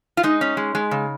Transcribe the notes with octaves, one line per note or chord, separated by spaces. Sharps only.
F4
G#3 D#4
C#4
G#3
G#3
C#3